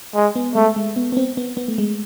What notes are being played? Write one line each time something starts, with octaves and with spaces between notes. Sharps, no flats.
G#3
B3
G#3 A3
G#3
B3
B3
C4
B3
B3
A3
G#3